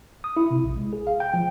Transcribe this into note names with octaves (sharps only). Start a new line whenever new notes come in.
D#6
E4
C3
A#1
G#3
G#4
F5
G5
F3